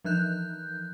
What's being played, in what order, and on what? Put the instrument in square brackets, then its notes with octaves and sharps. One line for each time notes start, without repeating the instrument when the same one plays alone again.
[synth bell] E3 F3 F#6 G6